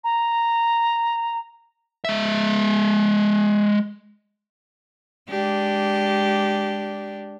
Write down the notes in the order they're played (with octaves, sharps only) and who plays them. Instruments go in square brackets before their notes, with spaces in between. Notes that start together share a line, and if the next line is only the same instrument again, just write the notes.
[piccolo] A#5
[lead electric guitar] G#3 E5
[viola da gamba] G#3 D4 G4